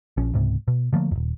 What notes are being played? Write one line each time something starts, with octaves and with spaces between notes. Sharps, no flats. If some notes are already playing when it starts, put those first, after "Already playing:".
A#1 F3 C#4
C#2 G#2 C3
B2
D3 F3 A3 A#3
D#1 F2